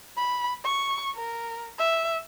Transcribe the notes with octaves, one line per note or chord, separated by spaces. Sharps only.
B5
C#6
A#4
E5